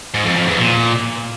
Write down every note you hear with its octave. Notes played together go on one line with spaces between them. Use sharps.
G#2
F2
F2
E2
A#2